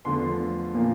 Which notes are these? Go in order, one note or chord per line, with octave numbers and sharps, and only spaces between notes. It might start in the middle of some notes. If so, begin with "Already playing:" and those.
E2 D3 F3 A3 C6
A#2 F3 A#3